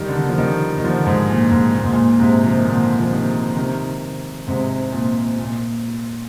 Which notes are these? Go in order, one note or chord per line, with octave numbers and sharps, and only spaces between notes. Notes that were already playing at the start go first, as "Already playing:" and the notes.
Already playing: D#3 G3
D3
D#3
F3
D#3 G3
D#3
D3 F3
G#2
A#2
G#2
A#2
G#2
A#2
G#2 C3
F3
D#3
A#2 D3
F3
C3 D#3
C3 D#3
G#2 C3
A#2
A#2